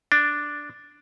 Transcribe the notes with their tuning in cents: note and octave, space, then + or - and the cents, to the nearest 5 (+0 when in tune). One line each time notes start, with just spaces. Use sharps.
D4 +0